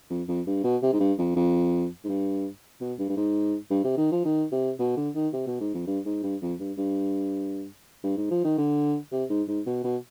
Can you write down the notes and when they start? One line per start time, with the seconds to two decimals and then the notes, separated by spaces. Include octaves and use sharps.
0.10 F2
0.28 F2
0.46 G2
0.64 B2
0.82 C3
0.93 G#2
1.00 G2
1.19 F2
1.36 F2
2.04 G#2
2.09 G2
2.81 B2
2.99 G2
3.09 G2
3.17 G#2
3.70 G2
3.84 C3
3.97 D#3
4.11 F3
4.25 D#3
4.52 C3
4.79 B2
4.97 D3
5.15 D#3
5.33 C3
5.47 B2
5.60 G#2
5.74 F2
5.87 G2
6.06 G#2
6.23 G2
6.42 F2
6.59 G2
6.78 G2
8.04 G2
8.17 G#2
8.31 F3
8.44 D#3
8.58 D3
9.12 C3
9.30 G#2
9.48 G#2
9.66 B2
9.84 B2